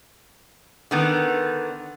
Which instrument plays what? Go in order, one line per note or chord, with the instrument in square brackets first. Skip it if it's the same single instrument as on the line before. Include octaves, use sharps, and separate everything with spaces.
[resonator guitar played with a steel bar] D3 D#3 B3